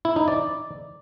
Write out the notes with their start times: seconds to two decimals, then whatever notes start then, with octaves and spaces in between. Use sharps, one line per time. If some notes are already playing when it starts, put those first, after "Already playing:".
0.05 E4
0.16 D#4
0.28 D5